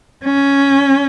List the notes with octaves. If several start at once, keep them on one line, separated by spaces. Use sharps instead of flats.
C#4